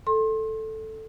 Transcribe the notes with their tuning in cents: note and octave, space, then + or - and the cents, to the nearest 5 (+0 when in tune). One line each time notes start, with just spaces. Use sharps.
A4 +0 C6 +30